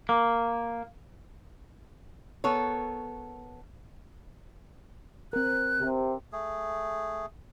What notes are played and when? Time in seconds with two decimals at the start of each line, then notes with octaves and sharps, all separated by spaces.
0.09 A#3
2.44 B3 A4 A#4 C#5
5.33 C4 A#4 F#6
5.80 C3
6.32 A3 G#4